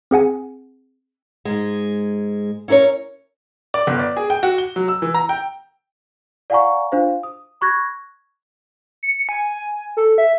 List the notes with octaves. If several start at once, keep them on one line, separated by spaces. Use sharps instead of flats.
C4 G#4 F#5 G#5
G#2 G#3
C#4 E4 A#4 C5 C#5
D5
G1
D5
G#4
G5
F#4
G7
F#3
E6
E3
A#5
G5
D5 F5 F#5 G#5 A#5 C#6
D4 F4 C5 F5
D#6
B5 C#6 F#6 G#6 A#6
C#7
G#5
A4
E5